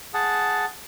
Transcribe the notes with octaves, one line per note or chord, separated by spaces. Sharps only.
G#4 F#5 A5